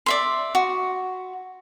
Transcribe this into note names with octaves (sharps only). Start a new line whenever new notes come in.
D5 E5 C6
F#4